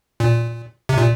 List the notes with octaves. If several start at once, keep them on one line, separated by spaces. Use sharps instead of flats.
A#2
C3
A#2